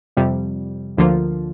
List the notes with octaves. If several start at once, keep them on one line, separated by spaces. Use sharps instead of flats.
F2 C3 G3
D2 D3 F3 A#3 F4